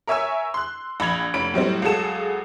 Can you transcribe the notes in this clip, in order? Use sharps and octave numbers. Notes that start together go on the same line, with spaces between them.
A#4 C#5 E5 G#5 C#6 E6
C6 F#6
A#1 B5 G#6 F7
F1 C#4 B5 D7
A2 F#3 G3 C4
C#2 F#3 F#4 G#4 A4 E7